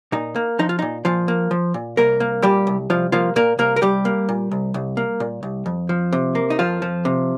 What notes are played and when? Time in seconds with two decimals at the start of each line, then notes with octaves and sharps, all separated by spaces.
0.12 A#2 D#4
0.36 A#3
0.59 F3 D#4
0.69 F4
0.79 A#2 D#4
1.05 A#2 F3 F4
1.28 A#3
1.51 F3
1.74 A#2
1.97 C2 A#3 A#4
2.20 A#3
2.43 A#2 G3 G4
2.67 C2
2.90 C2 F3 F4
3.12 F3 A#3 F4
3.36 A#2 A#3 A#4
3.58 C2 A#3 A#4
3.76 A#4
3.81 C2 G3 G4
4.05 A#3
4.29 A#2
4.51 C2
4.74 C2
4.97 A#3
5.20 A#2
5.43 C2
5.66 F2
5.89 F3
6.13 C3
6.35 A#3
6.50 D#4
6.59 F2 F3 F4
6.82 F3
7.05 C3